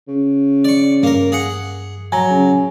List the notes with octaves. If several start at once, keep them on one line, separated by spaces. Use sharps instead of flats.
C#3
D5 C#6
G2 A#3 A#4
G#4 F#5
F#3 G#5 A#5
C#3